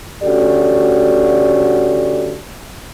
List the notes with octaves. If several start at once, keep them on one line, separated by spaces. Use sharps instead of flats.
D2 C#4 F#4 G4 A4 D5